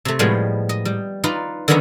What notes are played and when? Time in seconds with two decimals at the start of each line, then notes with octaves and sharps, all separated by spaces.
0.05 C3 A3
0.19 A2 F3 G3 G#3 B3
0.69 D#5
0.85 G3
1.24 D#4 F4 B4 D5
1.68 D3 D#3 F#3 B3 C#4 D#4